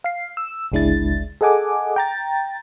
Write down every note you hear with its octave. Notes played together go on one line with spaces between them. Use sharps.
F5 C7
E6
G1 C#2 G#3 D4 E4 A6
G#4 A4 D#5 F#5 G#5 D6
G5 A#5 A6